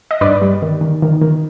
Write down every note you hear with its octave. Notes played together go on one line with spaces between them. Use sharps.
D#5
G2 B4 D5
G3
D#3
D#3
D#3
D#3